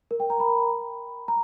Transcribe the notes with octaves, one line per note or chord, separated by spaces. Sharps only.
A#4
G5
A#5
B5
A#5